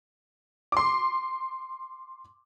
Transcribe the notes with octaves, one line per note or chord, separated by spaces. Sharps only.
C6 D6